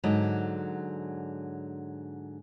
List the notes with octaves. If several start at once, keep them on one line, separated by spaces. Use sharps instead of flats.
G#2 D3 F#3